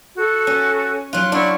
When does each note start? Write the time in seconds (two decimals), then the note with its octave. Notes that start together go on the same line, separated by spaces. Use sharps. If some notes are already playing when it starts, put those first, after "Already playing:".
0.16 F#4 A4
0.47 C#4
1.13 F#3 F4 F#6
1.32 D4 E4 F#5 C#6